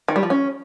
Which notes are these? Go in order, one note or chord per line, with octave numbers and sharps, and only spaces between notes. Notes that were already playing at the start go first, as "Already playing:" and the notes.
D#3
G3
F3
C#4